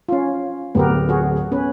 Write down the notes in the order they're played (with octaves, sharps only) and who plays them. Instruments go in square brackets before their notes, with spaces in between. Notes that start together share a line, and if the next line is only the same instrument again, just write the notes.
[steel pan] C#4 F4
[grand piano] D1 [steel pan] B3 G4 A#4
[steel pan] F#4 G#4
B3 C#4 B4